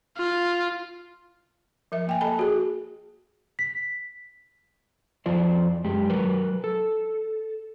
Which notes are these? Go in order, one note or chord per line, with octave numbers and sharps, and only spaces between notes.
F4
F3 A#4 E5
A#3 G5 G#5
A4 D#5 A5 B5
F#4 G#4
B6
F2 F3 F4 C5 D5
F#2 G#3 G4
F#3 A#4 B4
A4